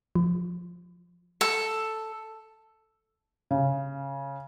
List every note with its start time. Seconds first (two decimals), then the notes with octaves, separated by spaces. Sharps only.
0.15 F3
1.41 A4
3.51 C#3